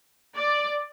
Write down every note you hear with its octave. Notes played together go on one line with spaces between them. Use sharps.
D5